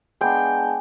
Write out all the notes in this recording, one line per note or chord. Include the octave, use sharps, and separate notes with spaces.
G#3 B3 D4 G5